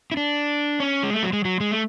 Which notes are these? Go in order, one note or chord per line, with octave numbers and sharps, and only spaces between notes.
E4
D4
C#4
G#3
A3
F#3
G#3
F#3
G#3
A3